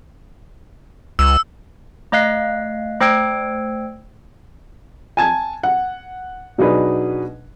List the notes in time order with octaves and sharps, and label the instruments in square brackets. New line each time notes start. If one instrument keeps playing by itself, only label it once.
[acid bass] C#2 [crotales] E6
[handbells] A3 D#5 F5 F#6 C7
A3 C5 G5 E6 G#6 D7
[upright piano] G#5 A5 G#6
F#5
B2 F#3 D4 D#4 G#4 B4